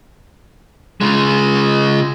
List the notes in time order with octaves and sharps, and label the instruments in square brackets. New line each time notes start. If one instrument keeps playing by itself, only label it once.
[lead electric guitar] C#3 G#3